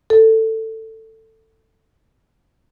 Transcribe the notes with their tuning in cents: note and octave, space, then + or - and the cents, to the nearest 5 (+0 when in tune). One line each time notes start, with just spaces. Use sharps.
A4 +15